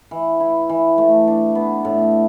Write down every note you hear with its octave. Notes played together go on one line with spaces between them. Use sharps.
E3
E4
E3
A3
D4
B3
A2